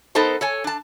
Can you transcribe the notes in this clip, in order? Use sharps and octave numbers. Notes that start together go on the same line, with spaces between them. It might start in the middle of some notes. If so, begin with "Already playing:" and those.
B3 D#4 A4 A#4 C5 A5
A4 C#5 G#5
D4 A5